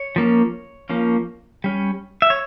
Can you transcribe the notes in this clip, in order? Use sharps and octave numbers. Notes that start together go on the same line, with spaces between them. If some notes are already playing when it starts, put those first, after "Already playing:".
Already playing: C#5
F3 A#3 C#4
F3 A#3 C#4
G3 C#4
E5
C#5